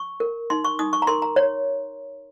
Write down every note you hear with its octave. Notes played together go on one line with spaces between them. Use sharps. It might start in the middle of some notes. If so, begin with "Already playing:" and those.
Already playing: C#6
A#4
D#4 C6
C#6
D#4 D#6
C#6
A#5
A#4 C6
A#5
C#5